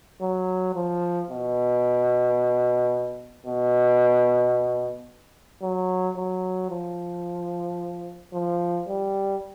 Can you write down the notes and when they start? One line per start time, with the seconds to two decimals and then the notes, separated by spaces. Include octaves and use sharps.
0.21 F#3
0.75 F3
1.30 B2
3.46 B2
5.62 F#3
6.16 F#3
6.70 F3
8.34 F3
8.88 G3